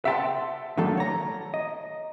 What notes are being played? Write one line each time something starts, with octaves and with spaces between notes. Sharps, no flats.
E5 F#5 G5 A5 A#5 C6
D3 D#3 F#3 A3 A#3 A4
C#5 A#5
D#5